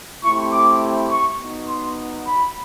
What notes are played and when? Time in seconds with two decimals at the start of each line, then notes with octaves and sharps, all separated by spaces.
0.23 A3 C4 E4 G4 C#6
0.52 D6
1.10 C#6
1.39 B3 D#4 F#4
1.68 C6
2.26 B5